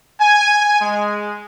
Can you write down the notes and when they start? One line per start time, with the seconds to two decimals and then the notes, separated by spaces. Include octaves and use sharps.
0.21 G#5
0.81 G#3